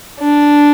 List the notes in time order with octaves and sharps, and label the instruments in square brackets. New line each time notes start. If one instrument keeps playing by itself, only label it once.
[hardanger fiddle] D4